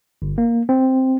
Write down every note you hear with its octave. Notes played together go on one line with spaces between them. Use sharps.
G1
A#3
C4